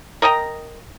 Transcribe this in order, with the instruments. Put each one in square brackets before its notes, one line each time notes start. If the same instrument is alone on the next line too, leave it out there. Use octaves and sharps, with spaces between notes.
[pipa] A#4 D#5 G5 A#5